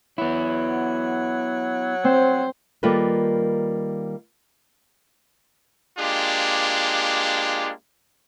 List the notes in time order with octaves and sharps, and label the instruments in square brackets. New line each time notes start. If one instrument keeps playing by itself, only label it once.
[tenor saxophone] F#3 [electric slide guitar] B3 E4
[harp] C4 [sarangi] C5
[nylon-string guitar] D#3 G3 A#3 F4 A4 B4
[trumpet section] G#3 A#3 D4 F4 G4